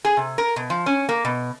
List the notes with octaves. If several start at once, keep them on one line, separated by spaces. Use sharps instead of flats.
G#4
C3
A#4
B2
F3
C#4
A#3
B2